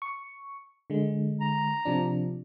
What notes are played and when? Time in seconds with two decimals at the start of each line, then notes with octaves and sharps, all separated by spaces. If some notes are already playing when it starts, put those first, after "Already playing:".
0.02 C#6
0.90 D3 G#3
1.41 A#5
1.85 C3 F3 D4